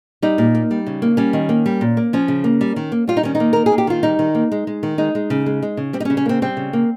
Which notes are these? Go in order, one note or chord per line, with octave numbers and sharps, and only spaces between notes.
G3 D#4
A#2
A#3
G3
C#3
A#3
G3 C#4
D#3
A#3
G3
A#2
A#3
F3 C#4
C#3
A#3
G3
D#3
A#3
G3 F4
D#4
D#3 C#4
D#4
A#3
A#3 A#4
G#4
A#3
G4
D#3 F4
G3 D#4
D#3
A#3
G#3
G#3
D#3
G#3 D#4
G#3
C#3
G#3
G#3
C#3
G3 C4
D#4
C#4
C#3
C#4
A#3 C4
G3 C4
C#3
A#3